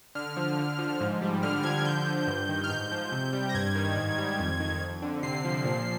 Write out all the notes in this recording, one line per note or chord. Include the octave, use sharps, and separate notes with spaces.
D3 F6
F3
D3
F3
G#2
G3
D3 F6
F3 G#6
D3 G6
F3
G2
D#3
F6
G#2 G6
F3
C3
G3
A#6
G2 G#6
D#3
G#2
G3
F2
D#3
F2
D3
C3 C7
F3
A#2